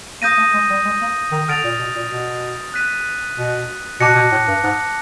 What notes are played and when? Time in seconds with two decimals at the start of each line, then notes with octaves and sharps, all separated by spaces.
0.22 A#3 D#6 G6 A#6 D#7
0.38 A3
0.54 G#3
0.70 G3
0.85 G#3
1.01 A#3
1.32 D#3
1.48 D3 F6 A6 D7 F7
1.64 A#2
1.79 B2
1.96 A#2
2.11 B2
2.74 F#6 B6 D#7
3.38 B2
4.00 B2 A5 D6 F#6 A#6 C#7
4.16 B2
4.32 A2
4.48 G2
4.64 G#2